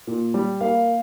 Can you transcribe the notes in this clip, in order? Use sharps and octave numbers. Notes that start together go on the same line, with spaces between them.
A#2
G3
A#3 F5